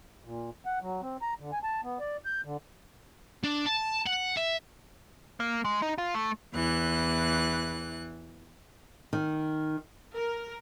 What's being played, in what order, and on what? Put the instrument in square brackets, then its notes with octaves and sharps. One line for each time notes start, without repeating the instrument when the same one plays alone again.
[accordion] A#2
F#5
F#3
C4
A#5
D3
G#5
A5
B3
D5
G6
D3
[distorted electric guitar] D4
A5
F#5
E5
[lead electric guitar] A#3
G#3
D#4
F4
A3
[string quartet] E2 E3 F#6
[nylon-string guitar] D#3
[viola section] A#4